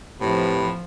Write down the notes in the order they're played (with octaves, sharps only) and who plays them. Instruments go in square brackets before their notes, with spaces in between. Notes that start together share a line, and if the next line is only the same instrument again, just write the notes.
[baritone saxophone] A2 [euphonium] C3 [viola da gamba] F3 [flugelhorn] B4